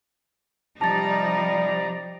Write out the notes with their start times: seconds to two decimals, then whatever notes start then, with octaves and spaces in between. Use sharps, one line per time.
0.81 C3 F3 G3 D#4 D5 A5 A#5 A6